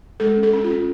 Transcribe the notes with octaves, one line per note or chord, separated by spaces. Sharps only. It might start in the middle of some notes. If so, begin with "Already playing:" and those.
G#3 A4
C#4
A4
C#4
F4
C#4